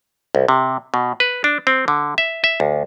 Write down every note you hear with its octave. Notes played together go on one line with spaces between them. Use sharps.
C2
C3
B2
B4
D4
C4
D3
E5
E5
D2